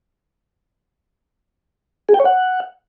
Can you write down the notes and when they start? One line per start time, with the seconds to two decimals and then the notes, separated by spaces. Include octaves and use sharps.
2.09 G#4
2.14 G5
2.20 C#5
2.25 F#5